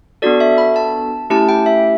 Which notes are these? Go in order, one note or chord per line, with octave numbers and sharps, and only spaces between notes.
B3 D4 F#4 A4 D5
E5
B5
A5
A3 C#4 E4 G4 A5
G5
E5